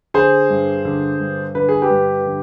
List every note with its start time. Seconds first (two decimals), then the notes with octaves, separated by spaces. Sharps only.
0.14 D3 G#4 C5
0.50 G2
0.85 D3
1.20 G2
1.55 D3 B4
1.69 G#4
1.82 G4 B4
1.90 G2
2.25 D3